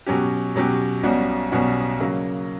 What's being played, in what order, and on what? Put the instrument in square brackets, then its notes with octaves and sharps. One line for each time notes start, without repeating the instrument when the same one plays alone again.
[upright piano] B2 F#3 C#4 G4
B2 F#3 C#4 G4
B1 B2 G3 C#4 F#4
B1 B2 G3 C#4 F#4
C#3 F#3 A#3